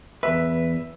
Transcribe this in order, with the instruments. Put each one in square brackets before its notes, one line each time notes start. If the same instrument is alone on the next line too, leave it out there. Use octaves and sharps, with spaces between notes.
[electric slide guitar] E2 B4 [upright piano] E5